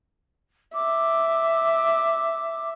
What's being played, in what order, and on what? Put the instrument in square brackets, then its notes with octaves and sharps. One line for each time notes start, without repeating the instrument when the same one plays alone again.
[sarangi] E5 [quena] D6